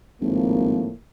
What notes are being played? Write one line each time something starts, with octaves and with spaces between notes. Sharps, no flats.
G#1 A2 F3 A#3